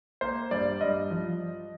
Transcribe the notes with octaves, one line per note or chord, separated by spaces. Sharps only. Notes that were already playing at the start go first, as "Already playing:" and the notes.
A#3 C5
G2 D5
G2 D#5
F3